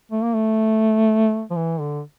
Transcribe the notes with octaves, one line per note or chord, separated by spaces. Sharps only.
A3
A#3
A3
F3
E3
D3